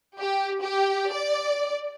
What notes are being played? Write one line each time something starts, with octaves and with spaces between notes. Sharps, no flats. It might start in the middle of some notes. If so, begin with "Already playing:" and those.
G4
G4
D5